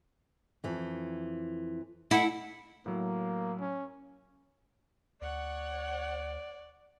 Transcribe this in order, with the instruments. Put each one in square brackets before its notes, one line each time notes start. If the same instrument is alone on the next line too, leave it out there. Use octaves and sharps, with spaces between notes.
[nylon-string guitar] F2 E3
[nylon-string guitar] A3 D#4 [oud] E4 [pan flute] F#5
[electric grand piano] A2 F#3 [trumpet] A#3
[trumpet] C#4
[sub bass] D2 [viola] C#5 F#5 [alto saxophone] D5